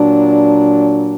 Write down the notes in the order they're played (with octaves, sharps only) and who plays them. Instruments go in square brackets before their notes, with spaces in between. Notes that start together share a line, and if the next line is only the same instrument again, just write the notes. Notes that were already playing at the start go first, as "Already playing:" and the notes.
Already playing: [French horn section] A#2 F#3 D4